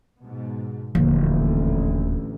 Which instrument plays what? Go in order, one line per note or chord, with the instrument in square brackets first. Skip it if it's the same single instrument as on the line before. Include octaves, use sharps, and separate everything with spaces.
[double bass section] G#2 B2
[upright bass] D#1 [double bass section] A1 D2 [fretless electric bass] D3 F3